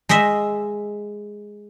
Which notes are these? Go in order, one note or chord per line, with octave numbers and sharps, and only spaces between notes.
G#3 C5 D#5 E5